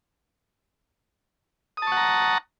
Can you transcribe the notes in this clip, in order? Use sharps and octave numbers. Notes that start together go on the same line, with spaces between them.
F#5 A5 A#5 C#6 D#6